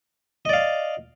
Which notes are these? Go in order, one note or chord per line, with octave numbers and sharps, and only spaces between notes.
D5 D#5 F5